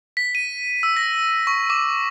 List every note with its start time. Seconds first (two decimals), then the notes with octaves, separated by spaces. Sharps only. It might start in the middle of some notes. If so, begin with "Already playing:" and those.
0.17 B6
0.35 D#7
0.83 E6
0.97 A#6
1.47 C#6
1.70 D6